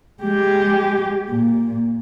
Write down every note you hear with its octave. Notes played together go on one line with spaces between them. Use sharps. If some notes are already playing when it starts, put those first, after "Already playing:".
G#3 G4
A#2